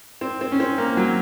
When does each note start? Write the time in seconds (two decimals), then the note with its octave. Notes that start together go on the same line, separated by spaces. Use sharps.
0.21 C4
0.41 C4
0.52 C#4
0.60 C4
0.78 A#3
0.97 F#3